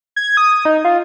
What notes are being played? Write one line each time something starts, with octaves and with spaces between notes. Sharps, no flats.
G#6
D#6
D#4
F4